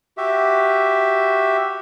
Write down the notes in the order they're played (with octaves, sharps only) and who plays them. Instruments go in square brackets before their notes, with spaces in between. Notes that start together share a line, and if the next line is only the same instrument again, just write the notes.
[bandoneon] F#4 G4 E5